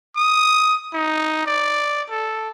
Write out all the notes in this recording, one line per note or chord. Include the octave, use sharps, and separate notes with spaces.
D#6
D#4
D5
A4